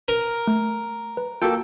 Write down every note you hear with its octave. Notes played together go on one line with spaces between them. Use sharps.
A#4
A3
B4
A#3 F4 F#4 A4 G5